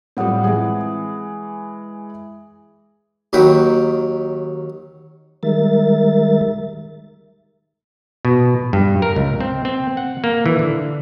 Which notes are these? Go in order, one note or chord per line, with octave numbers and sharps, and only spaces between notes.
A2 F3 G3 C4 F#5 D#6
E3 G#3 G#4
D#6
D#2 D#3 F#3 B4 G5
D#3 G3 G#3 A#4 E5 A6
B2
G2
A#4
C#2
C4
C4
F#5
A#3
E3
D3